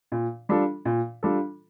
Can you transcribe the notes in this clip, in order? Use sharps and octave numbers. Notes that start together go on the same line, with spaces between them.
A#2
G3 D4 F4 A4
A#2
G3 D4 F4 A4